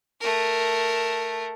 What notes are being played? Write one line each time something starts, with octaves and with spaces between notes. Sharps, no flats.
A3 A#4